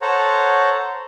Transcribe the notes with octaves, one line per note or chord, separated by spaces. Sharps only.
A4 C5 C#5 F#5 A#5